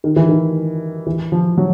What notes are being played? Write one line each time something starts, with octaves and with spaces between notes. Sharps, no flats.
D#3
E3
D#3
E3
F3
F#3